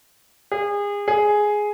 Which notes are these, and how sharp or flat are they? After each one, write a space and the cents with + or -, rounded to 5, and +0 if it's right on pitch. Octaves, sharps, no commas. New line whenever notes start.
G#4 -30
G#4 +5